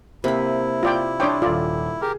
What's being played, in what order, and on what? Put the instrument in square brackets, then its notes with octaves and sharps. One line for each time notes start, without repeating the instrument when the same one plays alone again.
[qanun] C3 B5 [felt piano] A#3 [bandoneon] E4
[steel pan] F4 D5 G5
[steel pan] D4 C#5 G5 [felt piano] C6 D6 D#6
[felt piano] D#1 A4 [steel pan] F4 D5
[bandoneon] G4 A#4 [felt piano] G#4